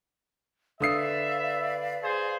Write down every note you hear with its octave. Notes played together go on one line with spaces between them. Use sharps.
D3 B4 D5 E5 F5 D#6 C7
G#4 C5